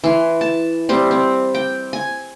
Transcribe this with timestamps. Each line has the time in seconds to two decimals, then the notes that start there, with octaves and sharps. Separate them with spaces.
0.04 E3 C6
0.41 A5
0.89 G3 C4 G4
1.11 C4
1.55 G5
1.93 G#5